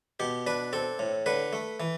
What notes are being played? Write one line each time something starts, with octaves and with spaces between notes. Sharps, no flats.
B2 G4
D4 B4
C4 A4
A2
D3 B4
A3
E3